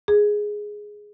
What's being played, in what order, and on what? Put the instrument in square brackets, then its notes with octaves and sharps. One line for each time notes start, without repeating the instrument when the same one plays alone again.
[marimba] G#4